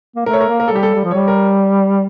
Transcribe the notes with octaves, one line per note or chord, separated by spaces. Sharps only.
A#3
A3 A#4
C#5
A#4
A#3
A#4
A4
G3 G4
A4
G3
F3
G3 C#5
A#4